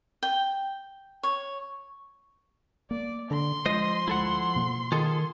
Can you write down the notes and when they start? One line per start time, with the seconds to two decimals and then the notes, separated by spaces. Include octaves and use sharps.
0.23 G5
1.23 C#5
2.91 A#3 D5
3.31 D3 C6
3.66 F3 G#3 C5 D#5
4.08 D2 G#3 E4 A4 F#5
4.56 B2 A#3
4.92 D#3 F4 G#4 A4